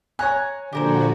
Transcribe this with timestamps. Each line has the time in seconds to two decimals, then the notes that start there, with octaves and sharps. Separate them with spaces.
0.19 C#5 G#5 A#5 F#6
0.73 A#2 D3 F3 F#4 G4 A#4 C5